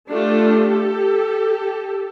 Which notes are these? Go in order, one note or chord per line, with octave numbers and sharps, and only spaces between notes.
A3 D4 F4 G4 A4